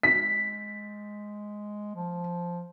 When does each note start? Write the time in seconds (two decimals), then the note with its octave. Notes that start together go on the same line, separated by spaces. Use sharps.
0.03 G#3 B6
1.95 F3